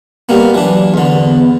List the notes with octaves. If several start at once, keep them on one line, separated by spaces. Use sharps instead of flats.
G3 A#3 B3
E3 F#3 D4
E2 D3
B3